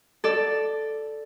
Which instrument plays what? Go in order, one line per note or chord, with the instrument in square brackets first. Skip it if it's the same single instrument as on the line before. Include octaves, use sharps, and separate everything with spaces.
[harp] A4 D5